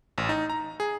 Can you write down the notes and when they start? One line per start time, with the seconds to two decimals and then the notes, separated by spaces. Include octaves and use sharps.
0.18 A1
0.29 D#4
0.50 A#5
0.80 G#4